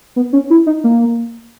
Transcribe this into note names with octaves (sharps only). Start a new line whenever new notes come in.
B3
C#4
E4
D#4
A#3